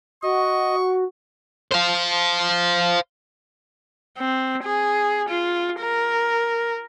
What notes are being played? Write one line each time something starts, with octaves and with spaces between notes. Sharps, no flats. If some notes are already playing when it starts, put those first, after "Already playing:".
F#4 D#5 C#6
C5 F5
C4
G#4
F4
A#4